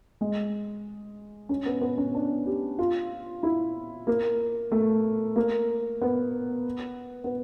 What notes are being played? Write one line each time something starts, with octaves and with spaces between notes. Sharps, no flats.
G#3
C#4
B3
B3
C#4
D4
G4
F4
E4
A#3
A3
A#3
B3
B3